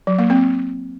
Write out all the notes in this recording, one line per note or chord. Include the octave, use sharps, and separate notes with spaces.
F#3
A#3
C4